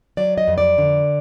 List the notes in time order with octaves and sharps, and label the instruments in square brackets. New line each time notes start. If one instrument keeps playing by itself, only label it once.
[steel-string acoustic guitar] F#3 D5
D#5
F2
D5
D3